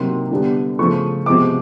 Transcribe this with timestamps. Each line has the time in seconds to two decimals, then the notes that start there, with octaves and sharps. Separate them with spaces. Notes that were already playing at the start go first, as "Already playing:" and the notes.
Already playing: C3 D#3 F#3 A#3 C6
0.31 D3 G3 B3
0.79 C#3 F3 A3 C#6
1.26 C3 F3 G#3 B3 D6